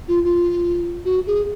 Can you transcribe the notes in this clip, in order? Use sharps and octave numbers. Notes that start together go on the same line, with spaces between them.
F4
F4
F#4
G#4